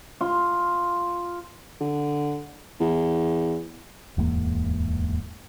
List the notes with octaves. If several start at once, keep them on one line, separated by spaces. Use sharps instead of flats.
F4
D3
E2
D1 E2 G#2 A#3